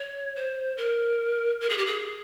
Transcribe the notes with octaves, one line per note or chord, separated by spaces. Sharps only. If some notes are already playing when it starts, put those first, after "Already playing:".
Already playing: C#5
C5
A#4
A#4
G#4
G4
G#4